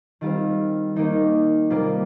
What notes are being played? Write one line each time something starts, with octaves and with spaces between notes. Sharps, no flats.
D#3 G3 C4 F4
D#3 A#3 D#4
C3 G3 A#3 F4